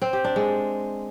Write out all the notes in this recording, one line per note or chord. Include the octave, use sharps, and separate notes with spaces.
C4
G4
D4
G#3